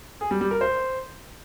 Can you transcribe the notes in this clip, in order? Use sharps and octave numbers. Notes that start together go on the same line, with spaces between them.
G#4
G3
G3
A#4
C5